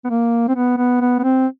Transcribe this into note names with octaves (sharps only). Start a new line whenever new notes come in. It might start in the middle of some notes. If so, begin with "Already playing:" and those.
B3
A#3
C4
B3
B3
B3
B3
C4